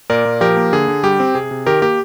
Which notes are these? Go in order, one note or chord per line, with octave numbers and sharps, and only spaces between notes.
A#2 A#4 D5
A#2
F3 G4 A#4
A#3
D3 G#4
D3
G3 G4
C4
C3 G#4
C3
D#3 G4 A#4
A#3 G4